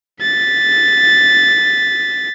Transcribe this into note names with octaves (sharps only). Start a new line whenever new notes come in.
A6 B6